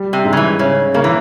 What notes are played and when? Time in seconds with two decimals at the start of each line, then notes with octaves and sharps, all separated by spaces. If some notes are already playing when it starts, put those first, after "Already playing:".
Already playing: G3
0.13 C3
0.25 G#2
0.33 C#3
0.37 E3
0.59 C#3 C#4
0.94 C#3 A#3
1.04 E3